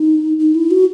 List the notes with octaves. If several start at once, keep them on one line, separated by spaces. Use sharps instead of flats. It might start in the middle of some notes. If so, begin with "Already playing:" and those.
Already playing: D#4
D#4
E4
F#4